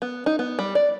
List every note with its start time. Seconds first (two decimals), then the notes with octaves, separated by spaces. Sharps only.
0.02 B3
0.26 D#4
0.39 B3
0.59 G3
0.75 D5